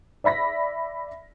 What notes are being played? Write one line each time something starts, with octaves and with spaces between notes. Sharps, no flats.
D5 E5 B5 A#6 B6